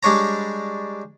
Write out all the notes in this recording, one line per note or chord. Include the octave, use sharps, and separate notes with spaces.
G3 G#3 D4 C#5 A#5